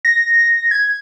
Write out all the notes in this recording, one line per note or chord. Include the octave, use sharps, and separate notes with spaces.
A#6
G#6